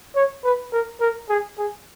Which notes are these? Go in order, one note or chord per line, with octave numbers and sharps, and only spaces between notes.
C#5
B4
A#4
A#4
G#4
G#4